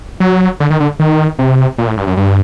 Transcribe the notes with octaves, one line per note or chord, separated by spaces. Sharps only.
F#3
D3
D#3
D3
D#3
C3
A#2
A2
G2
F#2
G2